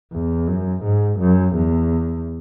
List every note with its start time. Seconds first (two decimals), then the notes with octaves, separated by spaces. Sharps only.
0.13 E2
0.48 F#2
0.84 G#2
1.20 F#2
1.56 E2